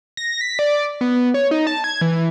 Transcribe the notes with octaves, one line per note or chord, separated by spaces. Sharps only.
A#6
B6
D5
B3
C#5
D#4
A5
G#6
E3